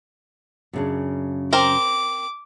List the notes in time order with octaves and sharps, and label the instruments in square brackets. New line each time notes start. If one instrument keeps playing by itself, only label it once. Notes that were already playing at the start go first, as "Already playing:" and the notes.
[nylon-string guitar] F#2 C#3 D4
[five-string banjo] C4 A#4 [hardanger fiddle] D6